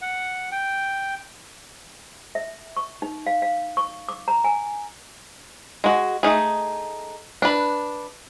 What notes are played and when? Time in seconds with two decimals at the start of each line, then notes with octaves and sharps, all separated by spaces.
0.02 F#5
0.52 G5
2.35 E5
2.77 C#6
3.02 D#4
3.27 F5
3.42 F5
3.77 C#6
4.09 D6
4.28 A#5
4.44 G#5
5.84 G#3 F#4
6.23 A3 D#4 G#4
7.42 D4 B4